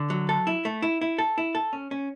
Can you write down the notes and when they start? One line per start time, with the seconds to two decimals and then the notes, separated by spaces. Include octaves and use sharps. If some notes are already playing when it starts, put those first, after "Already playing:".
Already playing: D3
0.10 F#3
0.29 A4
0.47 E4
0.65 A3
0.82 E4
1.01 E4
1.18 A4
1.38 E4
1.55 A4
1.73 C#4
1.91 C#4